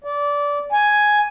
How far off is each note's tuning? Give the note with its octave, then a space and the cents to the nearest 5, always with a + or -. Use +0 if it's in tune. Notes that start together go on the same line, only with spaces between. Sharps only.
D5 -20
G#5 +5